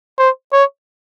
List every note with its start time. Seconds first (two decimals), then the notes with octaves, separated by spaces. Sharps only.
0.19 C5
0.53 C#5